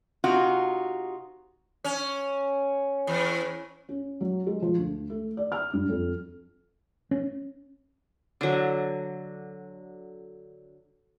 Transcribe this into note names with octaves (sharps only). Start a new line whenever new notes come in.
C3 D#4 F4 F#4
C#4
E2
C#4
F#3
G#3
F3
D2
A3
D5
F6
G2
F2
C#4
D3 F#3